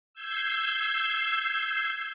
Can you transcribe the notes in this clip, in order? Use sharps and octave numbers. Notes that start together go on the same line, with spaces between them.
E6 G6 G#6 C7